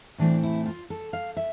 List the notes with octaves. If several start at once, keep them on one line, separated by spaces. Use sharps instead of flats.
A2 E3 A3 C4 D4
E4
F4
A4
F5
E5